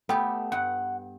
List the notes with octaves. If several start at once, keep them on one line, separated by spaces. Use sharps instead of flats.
A3 B3 G4 A4 G5
G2 F#5